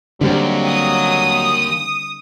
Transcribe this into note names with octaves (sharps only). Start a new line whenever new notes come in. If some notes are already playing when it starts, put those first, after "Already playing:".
D#2 D3 F#3 G3 C4
D#6